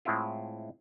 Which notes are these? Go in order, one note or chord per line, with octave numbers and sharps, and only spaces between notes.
A2 G#3 C4 E4 F4